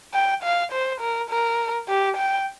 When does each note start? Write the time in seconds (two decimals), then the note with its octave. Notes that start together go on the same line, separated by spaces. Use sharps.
0.14 G5
0.43 F5
0.72 C5
1.01 A#4
1.30 A#4
1.88 G4
2.17 G5